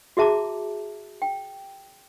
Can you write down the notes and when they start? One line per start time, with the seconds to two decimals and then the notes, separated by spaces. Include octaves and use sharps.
0.17 F#4 G#4 E5 A5 A#5 D6
1.22 G5